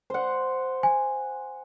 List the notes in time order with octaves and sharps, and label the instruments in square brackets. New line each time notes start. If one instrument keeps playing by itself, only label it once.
[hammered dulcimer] C5 F#5
[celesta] G#5